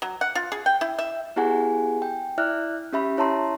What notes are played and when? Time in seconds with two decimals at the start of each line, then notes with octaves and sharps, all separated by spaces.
0.02 F#3
0.21 F#5
0.35 F4
0.52 G#4
0.66 G5
0.81 E4
0.99 E5
1.36 B3 E4 G4 G#4 F#5 G#5
2.02 G5
2.38 E4 D5 E5 F6 F#6
2.93 C#4 G4 E5 B5
3.17 E4 C#5 E5 A5 A#5 C6